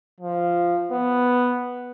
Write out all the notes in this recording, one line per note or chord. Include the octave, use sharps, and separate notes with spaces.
F3
B3